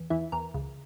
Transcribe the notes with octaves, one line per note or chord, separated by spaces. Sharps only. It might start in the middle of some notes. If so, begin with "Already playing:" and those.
Already playing: E2
E2 E4
E2 A#4
C#2